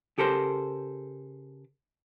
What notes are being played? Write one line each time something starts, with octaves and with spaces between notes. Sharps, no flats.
C#3 G4 A4 A#4 C5